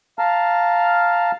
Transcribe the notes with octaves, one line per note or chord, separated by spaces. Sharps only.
F5 A5 A#5 F6